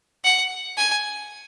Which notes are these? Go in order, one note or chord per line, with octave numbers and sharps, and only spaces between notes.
F#5
G#5